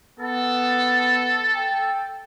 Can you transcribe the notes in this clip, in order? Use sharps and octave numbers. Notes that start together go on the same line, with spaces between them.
B3 A4
G5